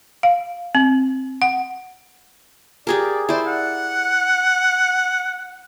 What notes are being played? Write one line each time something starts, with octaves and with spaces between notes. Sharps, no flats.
F5
C4
F#5
G4 G#4 A#4 D5
E4 C5 D5
F#5